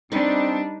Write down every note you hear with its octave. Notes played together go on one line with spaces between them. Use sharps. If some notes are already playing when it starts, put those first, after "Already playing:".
G3 C4 D4 D#4 B4